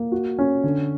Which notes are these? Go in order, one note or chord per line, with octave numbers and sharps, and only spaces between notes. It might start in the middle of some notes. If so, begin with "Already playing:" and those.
Already playing: A#3
F#4
C#4
D3